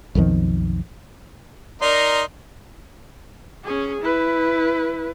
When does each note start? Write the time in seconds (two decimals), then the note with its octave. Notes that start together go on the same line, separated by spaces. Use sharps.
0.15 B1 F2 D#3 F3
1.82 D#4 A#4 D5 C6
3.64 C#4 G#4
4.01 E4 B4